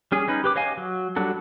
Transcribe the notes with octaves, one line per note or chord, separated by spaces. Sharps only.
G3 C#4 G#4
C#4 D#4 B4
G4 B4 D6
C#5 D#5 F5 G#5
F#3
F#3 G3 D4 F#4 A4